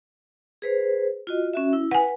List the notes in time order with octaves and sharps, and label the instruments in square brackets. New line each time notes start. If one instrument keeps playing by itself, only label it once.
[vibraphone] G#4 B4 C5
F4 F#4 D#5
C#4 F#4 E5
E4
[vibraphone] B4 [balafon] F#5 G#5